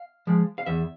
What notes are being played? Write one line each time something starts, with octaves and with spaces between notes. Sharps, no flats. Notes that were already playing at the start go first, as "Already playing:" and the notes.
Already playing: F5
F3 G#3
F5
E2 E5